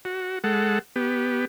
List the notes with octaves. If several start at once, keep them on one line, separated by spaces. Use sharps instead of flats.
F#4
G#3 A4 F#5
B3 G4